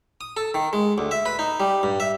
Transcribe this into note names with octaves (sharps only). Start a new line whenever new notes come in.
D#6
A4
D#3
G#3
D2
E5
B4
D#4
G3
G2
E5